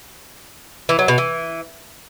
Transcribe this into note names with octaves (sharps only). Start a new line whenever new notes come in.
E3
F#3
B2
E3